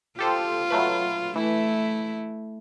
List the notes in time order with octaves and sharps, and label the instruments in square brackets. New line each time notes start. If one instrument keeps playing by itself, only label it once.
[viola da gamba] F4 [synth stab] G4 A4 C5
[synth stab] F#3 A3 B4
[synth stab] E3 [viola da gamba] A3 E4